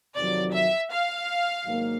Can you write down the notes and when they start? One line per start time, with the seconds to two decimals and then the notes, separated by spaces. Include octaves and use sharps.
0.16 F2 C3 D#3 F#3 D5
0.54 E5
0.90 F5
1.65 G#2 D#3 F#3 A#3